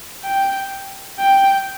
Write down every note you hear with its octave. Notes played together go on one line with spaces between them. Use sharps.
G5
G5